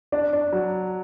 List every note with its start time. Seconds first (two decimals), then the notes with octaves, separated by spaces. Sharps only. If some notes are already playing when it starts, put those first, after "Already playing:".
0.12 D4 D5
0.33 D4
0.53 F#3